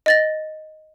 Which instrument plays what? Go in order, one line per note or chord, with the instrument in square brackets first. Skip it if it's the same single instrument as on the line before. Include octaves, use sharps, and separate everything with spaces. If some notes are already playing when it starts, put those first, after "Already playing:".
[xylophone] D#5 A6 A#6